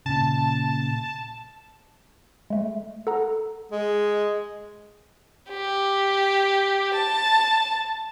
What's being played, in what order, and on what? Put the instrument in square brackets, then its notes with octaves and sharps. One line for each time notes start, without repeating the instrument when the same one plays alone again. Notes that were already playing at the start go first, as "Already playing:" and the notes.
[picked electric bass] A#2 C#3 [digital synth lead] A5
[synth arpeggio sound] G#3 A3
A4 F#5 A#5
[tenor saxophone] G#3
[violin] G4
A5